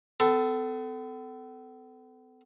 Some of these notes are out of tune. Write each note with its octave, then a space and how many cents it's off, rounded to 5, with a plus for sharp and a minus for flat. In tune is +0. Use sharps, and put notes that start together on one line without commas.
B3 +45 A4 +0